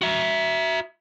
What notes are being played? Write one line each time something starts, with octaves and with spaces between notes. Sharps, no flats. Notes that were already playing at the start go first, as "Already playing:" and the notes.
F#4 E5